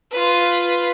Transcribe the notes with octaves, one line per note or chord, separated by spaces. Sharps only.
F4 B4